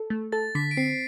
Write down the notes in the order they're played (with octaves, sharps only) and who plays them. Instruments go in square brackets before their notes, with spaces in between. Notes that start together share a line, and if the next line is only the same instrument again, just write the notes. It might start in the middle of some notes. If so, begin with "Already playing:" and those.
Already playing: [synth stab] A4
A3
[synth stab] A4 [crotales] A6
[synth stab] D3 [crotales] B6
[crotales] D7
[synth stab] C4 [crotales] C7